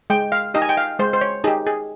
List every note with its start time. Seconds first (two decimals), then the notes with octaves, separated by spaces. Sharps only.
0.10 G#3 G5
0.32 F5
0.54 D#4 G4 D#5
0.62 G#5
0.69 G5
0.77 F5
0.99 G#3 C5
1.13 C5
1.21 C#5
1.44 D#4 G#4
1.47 G4
1.67 G#4